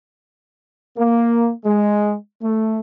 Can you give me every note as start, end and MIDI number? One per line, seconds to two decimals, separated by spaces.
0.97 1.52 58
1.64 2.14 56
2.42 2.79 57